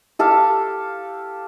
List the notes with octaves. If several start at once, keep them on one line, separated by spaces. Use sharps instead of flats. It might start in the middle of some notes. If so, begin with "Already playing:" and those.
G4 A4 F5